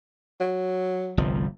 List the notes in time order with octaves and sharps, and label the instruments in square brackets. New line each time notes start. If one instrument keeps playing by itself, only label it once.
[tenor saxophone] F#3
[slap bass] G1 C2 F3